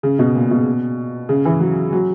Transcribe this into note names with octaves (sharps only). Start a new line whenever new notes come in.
C#3
B2
A#2
B2
C#3
E3
F#3
F#3